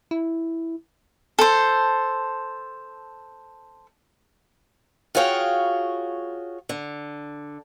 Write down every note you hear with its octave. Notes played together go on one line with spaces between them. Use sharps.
E4
A4 C5
F4 F#4 G#4 C#5 F5 G5
D3